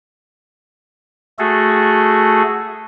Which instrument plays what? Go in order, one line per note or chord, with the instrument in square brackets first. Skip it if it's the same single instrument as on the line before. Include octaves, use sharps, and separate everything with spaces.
[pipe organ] A3 F#4 G#4 A4